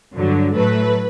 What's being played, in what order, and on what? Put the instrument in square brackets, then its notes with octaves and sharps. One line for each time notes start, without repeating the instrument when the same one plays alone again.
[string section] G2 D3 F#3
A2 F#3 A3 B4